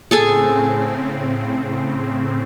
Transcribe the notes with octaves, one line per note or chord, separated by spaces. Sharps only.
A2 C#3 C4 G#4 A4 G#5